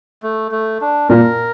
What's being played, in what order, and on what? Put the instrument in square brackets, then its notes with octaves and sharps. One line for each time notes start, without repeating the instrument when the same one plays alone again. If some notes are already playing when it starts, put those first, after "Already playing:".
[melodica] A3
A3
D4
[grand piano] A#2 [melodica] A#4